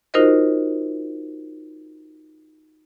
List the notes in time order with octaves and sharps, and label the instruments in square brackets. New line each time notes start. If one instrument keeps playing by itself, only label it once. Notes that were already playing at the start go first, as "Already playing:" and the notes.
[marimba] D#4 F4 F#4 A#4 C5 D#5